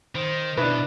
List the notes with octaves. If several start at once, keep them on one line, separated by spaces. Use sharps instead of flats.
D#3 C5
B2 D4 E4 B4